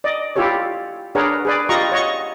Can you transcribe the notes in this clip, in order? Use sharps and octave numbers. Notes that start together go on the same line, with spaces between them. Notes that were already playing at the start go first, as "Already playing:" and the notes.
D5 D#5
E4 F4 G4 A4 C#5
D4 G#4 A#4 B4 C#5 F#5
G#4 B4 D5
F4 G4 D#5 A#5 C#6
C#5 D#5 F#5 C#6